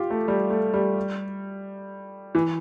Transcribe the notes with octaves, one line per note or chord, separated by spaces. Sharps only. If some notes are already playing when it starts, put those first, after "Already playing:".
Already playing: F4 G4
A3
G3
A3
G3
E3